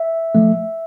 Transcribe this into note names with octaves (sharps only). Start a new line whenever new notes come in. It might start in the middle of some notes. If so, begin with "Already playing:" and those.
Already playing: E5
F3 A3